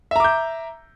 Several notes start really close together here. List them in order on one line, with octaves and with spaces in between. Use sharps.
E5 A#5 D6 G6